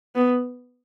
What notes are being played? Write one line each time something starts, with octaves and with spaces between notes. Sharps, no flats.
B3